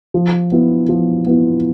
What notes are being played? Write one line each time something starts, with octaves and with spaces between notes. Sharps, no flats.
F3
B3 E4
F3
B3 E4